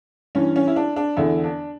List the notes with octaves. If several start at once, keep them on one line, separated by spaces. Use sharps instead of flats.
G2 E3 C#4
C#4
E4
D4
D4
E2 D3 E4
D4